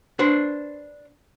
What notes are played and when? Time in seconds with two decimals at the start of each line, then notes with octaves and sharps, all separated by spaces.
0.19 D4 B4 C5